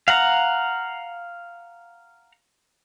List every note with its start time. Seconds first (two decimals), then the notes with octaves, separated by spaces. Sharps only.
0.08 F5 F#5 A#5